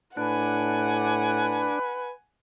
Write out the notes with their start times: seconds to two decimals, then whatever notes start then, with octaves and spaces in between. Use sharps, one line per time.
0.17 A2 D4 B4 F#5 G#5